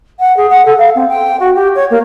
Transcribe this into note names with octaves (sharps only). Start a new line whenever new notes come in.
F#5
G#4
F#5
A4
F5
C4
G5
F#4
G4
C#5
A#3